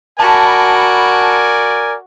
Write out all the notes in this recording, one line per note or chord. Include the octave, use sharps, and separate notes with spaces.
F#4 A#4 D5 G#5 A5 B5